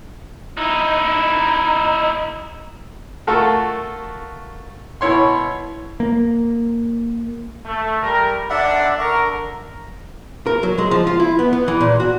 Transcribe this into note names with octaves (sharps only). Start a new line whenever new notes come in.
D#4 E4
A3 F4 F#4 A4 A#4
B2 E4 C#5 C6
A#3
A3
G3 A#4
B1 D3 D4 D5 E5 F#5
D3 A#4 C#6
A#4
F#3
G#3
F3
F4
E4
B3
B3
E3
A#2
F#4